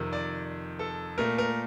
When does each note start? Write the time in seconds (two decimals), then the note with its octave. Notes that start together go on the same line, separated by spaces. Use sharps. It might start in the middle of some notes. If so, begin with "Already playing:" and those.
Already playing: F2 C3 D#3
0.13 D5
0.79 A4
1.18 A#2 A3 A#4
1.38 A#4